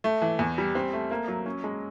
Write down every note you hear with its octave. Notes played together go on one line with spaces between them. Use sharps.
A3
E3
E2
G3
C4
A3
A#3
F#3
C#4
G#3